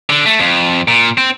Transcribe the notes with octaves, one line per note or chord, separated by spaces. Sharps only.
D3
A3
F2
A#2
C4